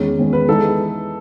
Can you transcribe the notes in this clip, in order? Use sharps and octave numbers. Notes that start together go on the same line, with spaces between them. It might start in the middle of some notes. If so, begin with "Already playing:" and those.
Already playing: E2 D#3 G#3 C#4
E2 D#3 G#3 C#4
B4
E3 G#3 B3 D#4 A4